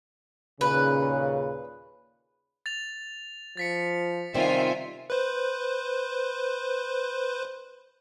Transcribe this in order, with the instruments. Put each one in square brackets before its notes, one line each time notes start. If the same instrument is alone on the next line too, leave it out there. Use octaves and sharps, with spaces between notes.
[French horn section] D#2 A#2 C#3 [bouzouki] B4
[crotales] A6 F7
[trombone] F3 [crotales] A6 B6 C#7
[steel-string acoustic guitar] C3 G3 C4 [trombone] D#3 [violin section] F4 E5 G#5
[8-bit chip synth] B4 C5